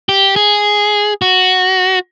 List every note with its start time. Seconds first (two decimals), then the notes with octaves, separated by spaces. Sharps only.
0.09 G4
0.36 G#4
1.22 F#4